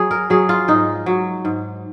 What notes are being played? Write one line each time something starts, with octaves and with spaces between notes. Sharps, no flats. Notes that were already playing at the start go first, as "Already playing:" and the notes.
Already playing: F#3 G#4
A#4
F#3 G#4
F4
G#2 D#4
F#3
G#2